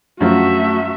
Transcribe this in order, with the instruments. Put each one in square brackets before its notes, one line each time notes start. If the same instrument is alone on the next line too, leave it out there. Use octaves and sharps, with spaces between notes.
[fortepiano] F#2 F3 [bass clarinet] A3 [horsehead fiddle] F#4 E5